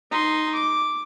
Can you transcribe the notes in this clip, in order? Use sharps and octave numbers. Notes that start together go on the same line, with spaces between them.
D#4 C6
D6